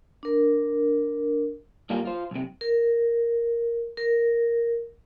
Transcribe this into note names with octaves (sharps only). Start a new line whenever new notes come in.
D4 A#4
G2 G3 A#3 F4
F4 C5
B1 C3
A#4
A#4